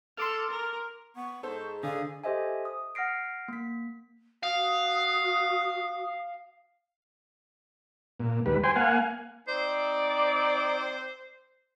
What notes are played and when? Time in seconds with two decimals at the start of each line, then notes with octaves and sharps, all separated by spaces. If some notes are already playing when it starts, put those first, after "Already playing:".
0.17 A4 C6 D6 F6
0.51 A#4
1.16 B3 C#6
1.43 G#2 A4 C5
1.83 D3 G#4 F5
2.24 G4 A4 C5 D#5 E5 G#5
2.65 D#6
2.95 F#5 F6 A#6 C7 D7
3.48 A#3 B6
4.43 F#4 F5 D#6
8.20 A#2
8.46 D#2 G3 B4
8.64 C5 G5 G#5 C6
8.76 A#3 F5 F#5 G#5
9.48 C4 D#4 C5 D5